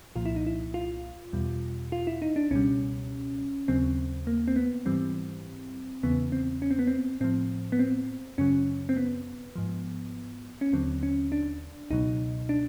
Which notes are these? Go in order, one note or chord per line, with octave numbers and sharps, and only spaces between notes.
C2 A#2 F3 F4
E4
D#4
E4
F4
E2 B2 G3
F4
E4
D#4
D4
C#2 B2 G3 C#4
D#2 C#3 F#3 C4
A#3
C4
B3
G#2 E3 G3 C4
E2 C#3 E3 B3
C4
C#4
C4
B3
C4
A2 F3 C4
B3
C4
F#2 C#3 F#3 C#4
C4
B3
G#2 F3
C#4
D#2 D3 F#3 C4
C#4
D4
C#2 B2 F#3 D#4
D4